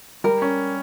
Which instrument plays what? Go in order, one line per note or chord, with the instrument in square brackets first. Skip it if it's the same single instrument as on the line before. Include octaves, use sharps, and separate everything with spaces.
[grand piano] G3 [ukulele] A#4
[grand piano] C#4